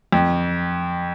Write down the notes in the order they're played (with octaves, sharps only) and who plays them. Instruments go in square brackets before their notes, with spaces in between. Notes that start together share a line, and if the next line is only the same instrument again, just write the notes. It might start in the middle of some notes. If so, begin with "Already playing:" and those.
[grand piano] F2